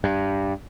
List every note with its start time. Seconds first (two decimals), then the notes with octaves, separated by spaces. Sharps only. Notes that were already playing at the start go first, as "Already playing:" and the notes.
0.04 G2